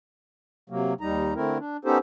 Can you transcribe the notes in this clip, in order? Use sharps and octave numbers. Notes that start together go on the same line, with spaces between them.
C3 F#3 A#3
D#2 G3 D#4 A#5
D3 A3 C4 E4 A#4
D4
B3 C#4 D#4 G4 A4 C5